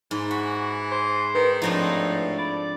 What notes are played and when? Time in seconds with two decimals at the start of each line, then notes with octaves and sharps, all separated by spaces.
0.11 G#2 E3
0.31 F#4 B5
0.92 C5
1.35 D#3 B4
1.62 A2 F3 C4 D4 D#4
2.38 D5 B5